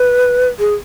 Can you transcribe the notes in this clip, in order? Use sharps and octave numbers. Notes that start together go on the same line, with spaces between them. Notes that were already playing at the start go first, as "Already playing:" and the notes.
Already playing: B4
G#4